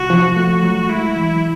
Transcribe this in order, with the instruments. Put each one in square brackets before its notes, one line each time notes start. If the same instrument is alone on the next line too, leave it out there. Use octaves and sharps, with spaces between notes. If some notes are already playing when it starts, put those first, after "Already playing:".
Already playing: [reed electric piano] C2 [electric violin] F#4
[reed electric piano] F3
[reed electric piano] A3 [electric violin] F#4
[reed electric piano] F#3
[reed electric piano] G#3 [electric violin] E4
[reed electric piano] E3